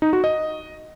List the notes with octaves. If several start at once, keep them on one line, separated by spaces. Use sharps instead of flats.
D#4
F#4
D#5